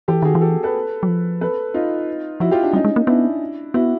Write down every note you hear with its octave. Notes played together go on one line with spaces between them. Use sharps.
E3 G4 A4
D#3 F#4 G#4
E3
G4 A4
A4 B4
F#3
F3
A4 B4
D#4 F4
F3 E4 F#4
F4 G4
D4
G3 C#4 D#4
G#3
A#3
B3 D4 E4
B3 E4 F#4